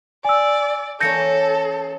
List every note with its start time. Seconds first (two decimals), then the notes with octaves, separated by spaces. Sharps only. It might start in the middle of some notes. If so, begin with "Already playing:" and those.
0.25 D5 G#5 E6
1.00 E3 A#3 C#4 A4 G6 A#6 C#7